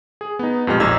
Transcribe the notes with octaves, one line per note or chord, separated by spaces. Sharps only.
G#4
B3 D#4
F2 A#2 G#3 G4 D#5 F6
A#1 E2 D#4 D#5 E6 G#6